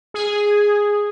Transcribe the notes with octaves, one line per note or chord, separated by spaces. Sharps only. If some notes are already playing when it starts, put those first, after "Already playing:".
G#4